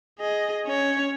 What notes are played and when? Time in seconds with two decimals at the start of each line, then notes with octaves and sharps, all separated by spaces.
0.19 G#4 D#5
0.66 C#4 C#5